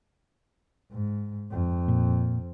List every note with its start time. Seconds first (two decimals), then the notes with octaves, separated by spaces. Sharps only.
0.92 G#2
1.51 F2
1.88 A#2